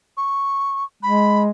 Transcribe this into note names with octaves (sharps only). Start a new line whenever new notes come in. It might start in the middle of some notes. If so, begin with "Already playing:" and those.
C#6
G#3 B5